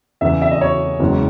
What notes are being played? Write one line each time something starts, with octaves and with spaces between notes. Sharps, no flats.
E2 C#3 E3 E5
E5
D#5
C#5
F#1 E2 C#3 G#3